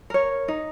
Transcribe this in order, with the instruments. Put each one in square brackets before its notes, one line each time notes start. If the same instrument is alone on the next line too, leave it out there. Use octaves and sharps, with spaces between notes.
[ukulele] A#4 C#5
D#4